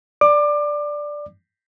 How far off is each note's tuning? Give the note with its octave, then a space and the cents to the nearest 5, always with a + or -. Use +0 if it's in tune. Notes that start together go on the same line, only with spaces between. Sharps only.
D5 +0 D6 +25